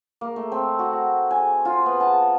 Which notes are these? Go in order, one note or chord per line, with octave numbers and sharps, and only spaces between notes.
A#3
A3
C4
F#4
A#5
G#5
F4
B3
A5